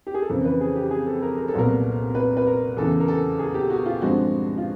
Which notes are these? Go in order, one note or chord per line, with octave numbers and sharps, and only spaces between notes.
G4
G#4
A4
F2 C#3 E3 A#4
B4
G#4
G4
G#4
A4
A#4
A#4
A4
C2 A#2 F#3 B3 A#4
B4
B4
A#4
E2 C#3 E3 A4
A#4
A4
G#4
G4
F#4
F4
G2 D3 F3 G#3 C4 F#4
F4